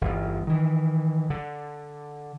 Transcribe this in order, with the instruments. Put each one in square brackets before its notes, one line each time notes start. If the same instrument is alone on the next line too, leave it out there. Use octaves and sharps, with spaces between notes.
[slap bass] G1 E2
D#3 E3
D3